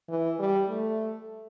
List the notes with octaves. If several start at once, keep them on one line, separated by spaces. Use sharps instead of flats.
E3
G3
A3